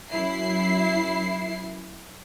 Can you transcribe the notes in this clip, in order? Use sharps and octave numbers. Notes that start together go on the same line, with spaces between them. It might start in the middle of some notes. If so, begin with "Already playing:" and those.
F#2 E4 C7